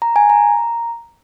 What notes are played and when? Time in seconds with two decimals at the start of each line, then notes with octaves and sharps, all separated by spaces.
0.02 A#5
0.16 G#5
0.30 A#5